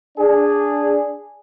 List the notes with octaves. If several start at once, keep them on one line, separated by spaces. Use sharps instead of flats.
D4 G#4